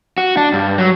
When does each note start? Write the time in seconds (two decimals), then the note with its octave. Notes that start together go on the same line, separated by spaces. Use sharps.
0.18 F#4
0.37 D4
0.53 G2
0.78 F#3